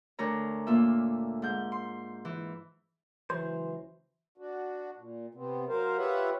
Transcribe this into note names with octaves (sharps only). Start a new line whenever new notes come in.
D2 D4 A#4 C#5 A#5
A#2 A#3 F4 E5
G#2 G6
C6
E3
C#2 E3 F#3 C5
D4 F#4
A#2
C3 B3 C4
F#3 A#4 C5 F5
F4 G4 B4 C#5 E5 F#5